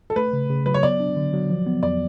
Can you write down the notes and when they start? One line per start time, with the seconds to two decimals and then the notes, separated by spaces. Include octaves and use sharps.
0.10 A4
0.16 A3 B4
0.33 C#3
0.50 C#3
0.66 F#3 B4
0.74 C#5
0.83 B3 D5
1.00 D4
1.16 D3
1.33 F#3
1.50 F3
1.66 B3
1.83 F2 D5